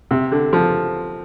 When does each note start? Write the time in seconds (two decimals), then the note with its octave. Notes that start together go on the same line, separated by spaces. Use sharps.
0.11 C3
0.32 D3
0.53 F3